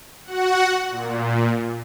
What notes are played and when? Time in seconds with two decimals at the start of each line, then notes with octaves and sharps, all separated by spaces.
0.24 F#4 F#5
0.90 A#2